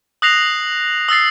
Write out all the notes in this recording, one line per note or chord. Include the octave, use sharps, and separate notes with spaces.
D#6 F#6 A#6 C7 F7
D#6 E6 A6 C7